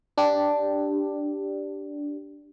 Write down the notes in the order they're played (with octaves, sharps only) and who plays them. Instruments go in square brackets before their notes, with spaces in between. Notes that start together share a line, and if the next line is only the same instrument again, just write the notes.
[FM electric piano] D4 G4